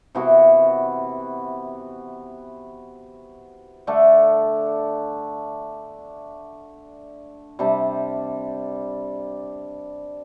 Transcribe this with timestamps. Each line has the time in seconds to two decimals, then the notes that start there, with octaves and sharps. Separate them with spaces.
0.15 C3 E3 B3 F#4
3.87 D3 A3 D4
7.59 C3 G3 D4